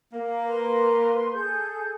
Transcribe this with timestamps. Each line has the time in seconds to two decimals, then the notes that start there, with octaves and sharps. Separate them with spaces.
0.13 A#3
0.46 B4 C6
1.33 G#4 A4 G6